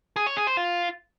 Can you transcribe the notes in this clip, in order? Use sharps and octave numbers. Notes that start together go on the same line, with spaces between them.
G#4
C#5
G#4
C5
F4